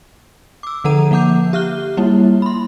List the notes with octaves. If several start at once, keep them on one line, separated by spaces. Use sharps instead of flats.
D6 E6
D3 F3 A4 F#5 A#5 D#7
F3 A#3 F#5 D6 G6
G4 E5 F6 F#6 G7
G3 A#3 E4
B5 C6